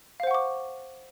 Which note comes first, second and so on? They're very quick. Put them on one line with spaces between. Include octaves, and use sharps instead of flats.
F5 C5 F#5 C#6 D6